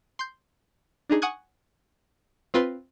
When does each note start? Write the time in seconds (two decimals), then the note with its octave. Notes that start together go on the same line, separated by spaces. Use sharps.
0.19 C6 G6
1.10 D4 D#4 G#4
1.22 F#5 G#5 C#6 D#6 F#6 G#6
2.54 C4 F4 B4 C6